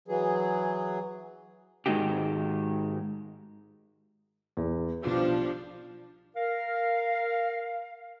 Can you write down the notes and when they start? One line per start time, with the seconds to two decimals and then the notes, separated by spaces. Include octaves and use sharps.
0.08 E3 F#3 G#4
1.86 G#2 D#3 G#3 D#4 F#4 G4
4.57 E2
5.04 B1 F3 G3 D4 F4
6.36 A#4 F5